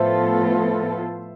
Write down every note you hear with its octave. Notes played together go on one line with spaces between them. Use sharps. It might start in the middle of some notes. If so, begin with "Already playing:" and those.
Already playing: A2 F3 B3 F4 A4 C5 E5